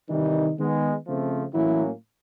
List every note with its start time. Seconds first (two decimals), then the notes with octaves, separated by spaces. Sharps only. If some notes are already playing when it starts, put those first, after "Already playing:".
0.10 C3 D#3 E3 G3 D#4
0.58 D#3 G#3 B3
1.05 C#3 F3 A3 C4
1.53 A2 E3 F#3 A#3 C#4 E4